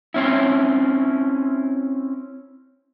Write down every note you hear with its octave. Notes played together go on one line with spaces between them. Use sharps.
C4 C#4 E4